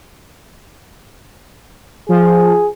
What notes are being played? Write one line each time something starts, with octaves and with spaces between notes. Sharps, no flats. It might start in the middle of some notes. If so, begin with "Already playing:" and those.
F3 G#4